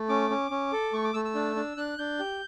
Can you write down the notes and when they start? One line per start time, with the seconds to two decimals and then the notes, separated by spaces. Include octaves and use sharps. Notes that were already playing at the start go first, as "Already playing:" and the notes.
Already playing: A3
0.09 C#4 D6
0.30 C#4
0.51 C#4
0.72 A4
0.93 A3 C#6
1.04 D6
1.14 A3 E6
1.25 E6
1.35 D4
1.56 D4
1.77 D4 F#6
1.98 D4 G6
2.19 G4